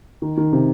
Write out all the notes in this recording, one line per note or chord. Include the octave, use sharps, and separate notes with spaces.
D#3
D#3
C3